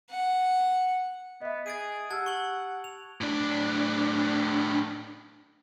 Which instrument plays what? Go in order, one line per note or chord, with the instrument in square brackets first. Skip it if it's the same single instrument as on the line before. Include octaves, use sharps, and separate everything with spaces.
[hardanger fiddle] F#5
[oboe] B3 [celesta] D#5 E5
[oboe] G#4 [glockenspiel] A6 D7 D#7
[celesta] G4 E6 F6 [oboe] F#5 [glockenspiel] A5 G#6
[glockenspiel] C#6 F#7 G7
F7
[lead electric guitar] A2 D4